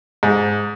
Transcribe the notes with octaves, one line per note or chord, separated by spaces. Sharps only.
G#2